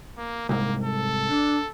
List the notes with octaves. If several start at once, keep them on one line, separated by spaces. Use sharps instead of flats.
A#3
C2 G#2 A#3
A4
D4